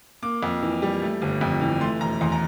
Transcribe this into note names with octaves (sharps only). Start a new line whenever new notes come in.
A#3 D6
F2
E3
G3
A3
G1
F2
E3
A3 C6
E1 A#5
E2 C6
A#5